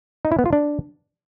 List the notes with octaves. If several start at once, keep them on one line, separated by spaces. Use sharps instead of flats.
D#4
E4
B3
F4
D4